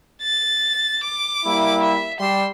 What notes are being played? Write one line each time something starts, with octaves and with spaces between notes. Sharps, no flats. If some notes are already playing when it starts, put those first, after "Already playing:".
A6
D6
G3 A#3 E4
E5
G3 G4 C6 E6